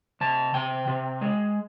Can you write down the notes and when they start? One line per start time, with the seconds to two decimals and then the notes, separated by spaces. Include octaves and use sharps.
0.21 C3 A5
0.54 C3 G5
0.87 C3
1.21 G#3